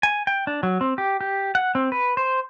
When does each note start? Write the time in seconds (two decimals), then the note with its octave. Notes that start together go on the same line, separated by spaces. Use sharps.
0.03 G#5
0.27 G5
0.47 D4
0.63 F#3
0.81 C4
0.98 G4
1.21 G4
1.55 F#5
1.75 C4
1.92 B4
2.17 C5